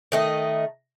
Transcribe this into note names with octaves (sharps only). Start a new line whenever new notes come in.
D#3 A3 D#5